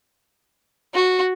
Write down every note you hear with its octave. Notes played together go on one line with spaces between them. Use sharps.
F#4